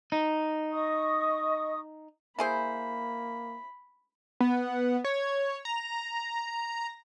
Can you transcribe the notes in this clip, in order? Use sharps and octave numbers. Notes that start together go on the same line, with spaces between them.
D#4
D#5 C#6 D#6
A#3 E4 G#4 C5 B5
B3
C#5
A#5